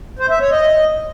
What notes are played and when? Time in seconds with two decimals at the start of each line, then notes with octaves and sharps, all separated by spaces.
0.19 C5
0.30 E5
0.40 C#5
0.51 D#5